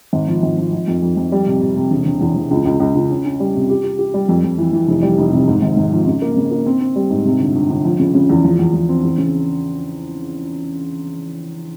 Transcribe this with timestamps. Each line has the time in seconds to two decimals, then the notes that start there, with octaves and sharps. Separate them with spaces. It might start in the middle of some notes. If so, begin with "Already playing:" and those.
0.13 G#1
0.28 F3
0.43 G#1
0.58 F3
0.73 F3
0.87 F2
1.02 F2
1.17 F2
1.32 G3
1.46 C3
1.61 C3
1.76 C3
1.91 E1
2.06 E1
2.21 E2
2.36 E2
2.51 C#2
2.65 C#2
2.80 C#2
2.95 C#2
3.10 C#4
3.25 C#4
3.40 G3
3.55 C3
3.69 G4
3.84 G4
3.99 G4
4.14 G3
4.29 F2
4.44 F2
4.58 E3
4.73 E3
4.88 F1
5.02 G3
5.18 F1
5.33 C3
5.48 G#2
5.62 G#1
5.77 G#1
5.92 F3
6.07 C#3
6.22 A#3
6.37 C#3
6.51 A#3
6.66 C4
6.81 C4
6.96 G3
7.10 G#2
7.25 C3
7.40 G1
7.55 G1
7.70 G1
7.85 F3
8.00 C#3
8.14 C#3
8.30 E2
8.44 F3
8.59 E2
8.74 E2
8.89 C4
9.04 E2
9.18 C#3